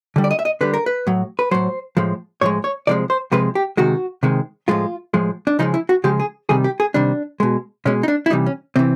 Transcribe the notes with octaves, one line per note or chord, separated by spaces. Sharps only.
D3 G3
D5
D#5
E5
D#5
D3 G3 B4
A#4
B4
A2 F#3
B4
A2 F#3 C5
A2 F3 G#3
A2 F3 G#3 C#5
C#5
C3 F3 G#3 D5
C5
C3 F3 G#3 B4
G4
C3 D#3 G#3 F#4
C3 D#3 G#3
A2 F3 G#3 F4
A2 F3 G#3
D4
C#3 F3 G#3 D#4
E4
F#4
C#3 F3 G#3 G4
G#4
C3 D#3 G3 G#4
G4
G#4
C3 D#3 G3 D4
B2 G#3
B2 G#3 C#4
D#4
D4
E4
C3 E3 G3 D#4
C#4
C3 E3 C4